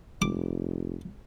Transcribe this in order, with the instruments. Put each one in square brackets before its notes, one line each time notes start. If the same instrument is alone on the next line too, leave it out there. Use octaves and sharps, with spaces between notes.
[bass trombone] F1 [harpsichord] D6